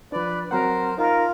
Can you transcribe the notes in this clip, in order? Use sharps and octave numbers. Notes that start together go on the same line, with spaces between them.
F3 D4 B4 D5
F#3 C4 A#4 C5 F#5
D#4 F4 A#4